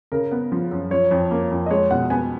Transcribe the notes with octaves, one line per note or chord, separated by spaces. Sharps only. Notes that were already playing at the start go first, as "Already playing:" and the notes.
C#3 A#4
B3
F3
F#2
F3 C#5
F2
A#3
F2
D#5
G#3 C#5
B2 F#5
B3 G#5